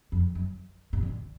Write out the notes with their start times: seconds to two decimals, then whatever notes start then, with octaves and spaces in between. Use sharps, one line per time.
0.12 F2
0.35 F#2
0.93 B2
1.03 D3